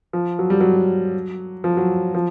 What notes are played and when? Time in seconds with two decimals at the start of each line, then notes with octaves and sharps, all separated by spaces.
0.13 F3
0.39 F#3
0.50 G3
0.60 F#3
1.64 F3
1.77 F#3
2.15 F3